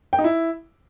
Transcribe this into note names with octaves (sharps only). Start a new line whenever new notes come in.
G5
D#4
E4